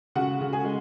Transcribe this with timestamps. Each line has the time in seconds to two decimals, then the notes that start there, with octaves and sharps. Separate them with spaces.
0.16 C#3 F#4 F#5
0.41 C#3
0.53 G#4 G#5
0.64 G#3